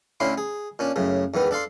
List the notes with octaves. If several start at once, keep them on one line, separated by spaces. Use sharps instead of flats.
A2 D3 C#4 E4 F5 C6
G#4
A#2 C#4 D4
F#2 A2 C#3
E2 G#2 D#3 B3
D4 A4 F5 C6